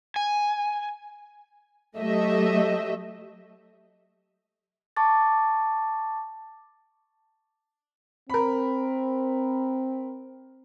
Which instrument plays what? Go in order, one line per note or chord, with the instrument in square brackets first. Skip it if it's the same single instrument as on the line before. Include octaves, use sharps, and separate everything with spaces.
[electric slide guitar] G#5
[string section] F#3 A3 G4 D#5 E5
[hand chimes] A5 C#6 D6 A6
[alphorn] C4 [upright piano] A#4 B5